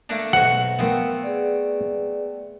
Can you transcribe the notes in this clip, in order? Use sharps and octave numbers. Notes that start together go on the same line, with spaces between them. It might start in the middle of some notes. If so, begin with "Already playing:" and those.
A3 A#3 D4
B1 F#4 G#4 C5 E5 F#5
A3 B3 C4 A#4 F5
G#4 B4 D5